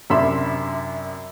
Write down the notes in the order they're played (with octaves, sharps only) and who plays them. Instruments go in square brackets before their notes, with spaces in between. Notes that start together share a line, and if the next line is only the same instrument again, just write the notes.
[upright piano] F#2 C3 D4 E5 B5 C6